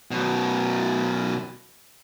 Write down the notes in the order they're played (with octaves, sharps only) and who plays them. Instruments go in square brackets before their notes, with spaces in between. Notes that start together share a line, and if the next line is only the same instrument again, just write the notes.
[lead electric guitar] F#2 B2